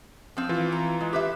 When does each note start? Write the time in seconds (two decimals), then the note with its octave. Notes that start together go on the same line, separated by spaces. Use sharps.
0.37 F3 C4
0.49 E3 F4
0.72 A#5
1.01 G#3
1.13 G4 B4 E5